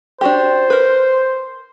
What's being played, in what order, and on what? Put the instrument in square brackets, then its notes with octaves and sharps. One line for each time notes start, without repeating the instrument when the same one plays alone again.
[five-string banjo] D4 F#4 G4 [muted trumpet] C5
[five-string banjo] A#4 B4